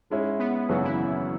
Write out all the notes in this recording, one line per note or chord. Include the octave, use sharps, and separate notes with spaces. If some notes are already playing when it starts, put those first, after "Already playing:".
G#2 G#3 C#4 E4
B3
G#1 F#2 C#3 E3 F#3 B3
E4